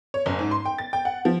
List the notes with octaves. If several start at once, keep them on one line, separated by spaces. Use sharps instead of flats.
C#5
F#1
G#2
C6
G5
A6
G5
F#5
F3